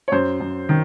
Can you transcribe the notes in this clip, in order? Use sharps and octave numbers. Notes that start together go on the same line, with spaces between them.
C#5
F#2 C5
F#2
D#3